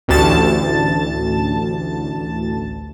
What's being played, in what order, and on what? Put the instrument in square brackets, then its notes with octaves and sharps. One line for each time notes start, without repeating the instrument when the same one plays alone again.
[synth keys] A1 D2 A5 A6